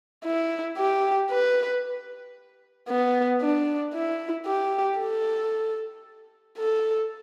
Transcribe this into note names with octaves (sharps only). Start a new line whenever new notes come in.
E4
G4
B4
B3
D4
E4
G4
A4
A4